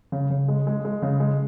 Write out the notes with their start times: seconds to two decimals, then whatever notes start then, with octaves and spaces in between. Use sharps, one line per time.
0.12 C#3
0.30 C#3
0.48 G#3
0.67 G#3
0.85 G#3
1.02 C#3
1.20 G#3